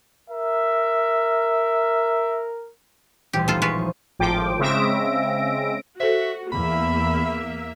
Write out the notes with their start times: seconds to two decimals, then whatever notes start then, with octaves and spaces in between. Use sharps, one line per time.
0.30 A#4 E5
3.33 D#1 A1 D2 G4
3.48 A3 B3 D#4 F4 A4
3.62 G#3 F4 B4 C#6
3.78 F3
4.19 G#1 A2 F3 G5 D6
4.59 C#3 G#3 C4 E5 A#6 D7
6.00 F#4 A4 C5 E5
6.52 E2 A#3 E5 B5